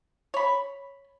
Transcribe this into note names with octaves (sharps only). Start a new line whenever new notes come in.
C#5 B5